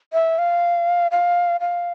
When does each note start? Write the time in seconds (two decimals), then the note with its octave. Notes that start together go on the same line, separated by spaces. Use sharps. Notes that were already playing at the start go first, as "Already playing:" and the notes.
0.13 E5
0.38 F5
1.11 F5
1.60 F5